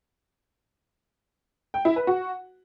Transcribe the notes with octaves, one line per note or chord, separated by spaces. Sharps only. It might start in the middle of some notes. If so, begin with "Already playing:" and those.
G5
E4
B4
F#4